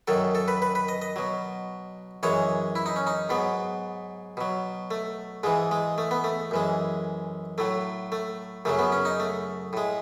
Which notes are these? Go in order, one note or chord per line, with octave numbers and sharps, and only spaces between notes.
F#2 D#3 F#3 A4
A4
B4
B4
B4
D#5
D#5
B2 F#3
F#2 E3 G#3 C#5
E4
D#4
C#4
D#4
G#2 F#3 B3
B2 F#3
A3
G#2 E3 G#3
G#3
A3
B3
A3
F#2 E3 G#3
A2 F#3 A3
A3
F#2 C#3 F#3 A3
B3
C#4
D#4
A3
A2 G#3